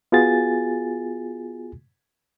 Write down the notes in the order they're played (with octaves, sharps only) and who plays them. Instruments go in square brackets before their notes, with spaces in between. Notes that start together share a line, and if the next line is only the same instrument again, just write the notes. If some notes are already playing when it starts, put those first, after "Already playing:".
[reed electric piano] B3 F4 F#4 G#4 G#5 A6